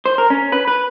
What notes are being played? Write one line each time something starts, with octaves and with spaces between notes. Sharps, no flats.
C5
A#4
C#4
B4
B4